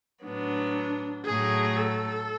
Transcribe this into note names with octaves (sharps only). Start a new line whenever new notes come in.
A2 F#3 B3 D4
A2 F#3 A3 G#4
A4